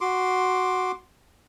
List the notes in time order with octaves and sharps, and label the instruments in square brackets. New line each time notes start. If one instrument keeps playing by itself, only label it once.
[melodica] F#4 C6 D6